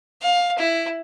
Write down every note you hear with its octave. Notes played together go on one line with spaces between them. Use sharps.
F5
E4